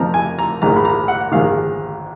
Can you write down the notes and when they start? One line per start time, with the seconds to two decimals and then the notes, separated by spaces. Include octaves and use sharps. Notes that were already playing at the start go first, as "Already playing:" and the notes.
Already playing: F2 F3 A#5
0.14 G#5
0.39 A#5
0.62 A#1 G#2 D#3 A#5
0.76 B5
0.85 A#5
1.08 F#5
1.32 A#1 G#2 D#3 F5